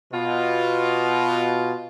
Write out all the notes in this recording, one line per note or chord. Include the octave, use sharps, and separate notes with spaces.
B2 F4